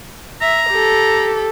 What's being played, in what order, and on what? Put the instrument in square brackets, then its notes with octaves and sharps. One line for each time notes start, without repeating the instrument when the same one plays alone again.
[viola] E5 [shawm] A#5
[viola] G4 A4